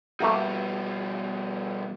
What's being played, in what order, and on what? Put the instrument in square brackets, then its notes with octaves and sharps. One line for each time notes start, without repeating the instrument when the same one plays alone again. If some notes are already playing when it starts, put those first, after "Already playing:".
[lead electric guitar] B2 G3 [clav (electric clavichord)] A3 A#3 F#4